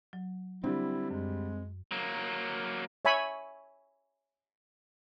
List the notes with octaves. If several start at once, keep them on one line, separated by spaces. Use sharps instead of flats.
F#3
D3 G3 C4 E4
F#2 G#3
F#3 A#3
C#5 E5 G#5 B5 C#6